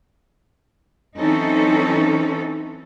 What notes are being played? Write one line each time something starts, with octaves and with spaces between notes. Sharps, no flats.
E3 F#3 C4 C#4 D#4 A4